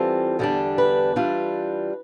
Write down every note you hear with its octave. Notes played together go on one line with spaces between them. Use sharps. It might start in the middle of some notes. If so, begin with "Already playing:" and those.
Already playing: E3 G3 C4 F4 A4
E2 D3 G3 D4
B4
E3 G3 D4 F4